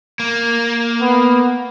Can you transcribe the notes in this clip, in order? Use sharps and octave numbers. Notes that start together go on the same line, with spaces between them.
A#3
B3